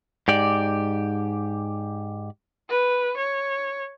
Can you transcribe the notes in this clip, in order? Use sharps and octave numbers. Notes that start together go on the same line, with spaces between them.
G#2 G4 D5
B4
C#5